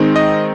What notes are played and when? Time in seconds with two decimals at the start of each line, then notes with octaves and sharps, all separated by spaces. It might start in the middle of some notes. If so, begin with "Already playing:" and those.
Already playing: D#3 G#3 C4 D#4
0.16 D#5